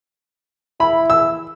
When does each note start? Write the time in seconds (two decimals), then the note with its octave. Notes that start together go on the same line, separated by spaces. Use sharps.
0.80 E4 B5
1.10 E6